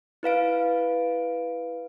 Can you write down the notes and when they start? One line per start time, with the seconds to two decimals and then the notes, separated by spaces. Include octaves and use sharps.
0.23 E4 B4 F5 D7